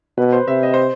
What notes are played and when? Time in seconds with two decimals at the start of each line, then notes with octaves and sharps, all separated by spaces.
0.18 B2 B4
0.32 C5
0.48 C3 E5
0.63 D#5
0.74 C5